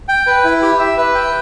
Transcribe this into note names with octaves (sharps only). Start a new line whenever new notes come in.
G5
B4
E4
G4
E5
B4
G5